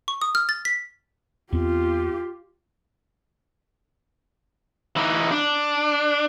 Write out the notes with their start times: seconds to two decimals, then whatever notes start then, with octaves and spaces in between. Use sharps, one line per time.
0.08 C#6
0.22 D#6
0.35 F6
0.49 A6
0.65 B6
1.52 E2 B3 C4 F4 G4
4.96 E3 D#4
5.32 D4